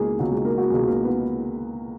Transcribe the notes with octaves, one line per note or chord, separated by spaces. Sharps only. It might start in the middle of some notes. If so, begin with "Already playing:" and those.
Already playing: C#2 B2 G#3 A#3 B3 G#4
C#2 B2 F#3 F#4
G#3 G#4
A#3 A#4
F#3 F#4
C#2 B2 G#3 G#4
A#3 A#4
B3 B4